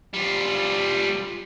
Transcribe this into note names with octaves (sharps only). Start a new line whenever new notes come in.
G3 F4